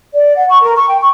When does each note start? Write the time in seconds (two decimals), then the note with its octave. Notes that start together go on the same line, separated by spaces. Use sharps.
0.13 D5
0.36 F#5
0.49 C#6
0.61 A#4
0.75 C#6
0.87 G5
1.00 C#6